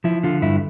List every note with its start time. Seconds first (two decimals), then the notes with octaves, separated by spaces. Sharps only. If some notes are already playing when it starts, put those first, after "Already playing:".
0.04 F3 E4
0.23 D3 F4
0.42 G2 E4